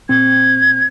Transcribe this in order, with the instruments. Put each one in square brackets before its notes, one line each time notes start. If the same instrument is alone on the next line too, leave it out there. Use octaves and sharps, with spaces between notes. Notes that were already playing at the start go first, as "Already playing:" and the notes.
[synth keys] A#2 C4 [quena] G#6